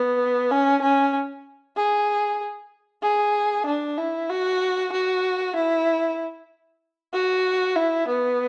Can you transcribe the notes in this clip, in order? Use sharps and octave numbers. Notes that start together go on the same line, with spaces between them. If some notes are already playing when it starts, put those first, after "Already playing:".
Already playing: B3
C#4
C#4
G#4
G#4
D4
E4
F#4
F#4
E4
F#4
E4
B3